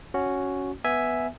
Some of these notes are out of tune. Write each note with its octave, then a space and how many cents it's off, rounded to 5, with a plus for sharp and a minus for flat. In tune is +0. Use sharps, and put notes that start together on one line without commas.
C#4 +0 F#4 +0
B3 +0 E5 +0 G#5 +0